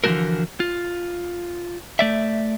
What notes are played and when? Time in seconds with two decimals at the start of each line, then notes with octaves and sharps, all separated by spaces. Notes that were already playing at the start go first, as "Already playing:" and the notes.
0.04 D3 E3 F3 A3 F#4 A#4
0.60 F4
1.99 A3 D5 E5